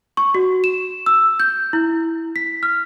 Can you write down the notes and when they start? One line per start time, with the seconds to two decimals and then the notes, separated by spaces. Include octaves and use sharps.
0.17 C#6
0.35 F#4
0.64 E7
1.06 E6
1.40 G6
1.73 E4
2.36 B6
2.63 F6